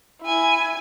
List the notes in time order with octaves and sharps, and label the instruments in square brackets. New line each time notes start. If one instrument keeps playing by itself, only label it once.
[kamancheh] E4 G#5